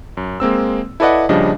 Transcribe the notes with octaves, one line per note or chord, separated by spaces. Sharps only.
F#2
G#3 A#3 C4 E6
E4 A4 B4 D5 D#5 F#5
A#1 C#3 F3 G3 D4 D#5